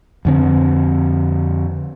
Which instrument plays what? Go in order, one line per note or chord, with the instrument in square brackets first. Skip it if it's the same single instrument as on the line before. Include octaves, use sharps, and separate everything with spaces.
[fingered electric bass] F2 D3 C4